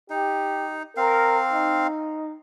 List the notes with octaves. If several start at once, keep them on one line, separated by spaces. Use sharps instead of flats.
D#4 G4
C4 A#4 F5
D#4